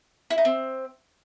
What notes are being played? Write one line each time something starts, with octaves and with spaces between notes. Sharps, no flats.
E4
D#4
C4